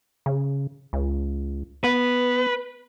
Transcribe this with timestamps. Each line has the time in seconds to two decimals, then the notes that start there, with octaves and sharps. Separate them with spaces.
0.26 C#3
0.93 C#2
1.84 B3 B4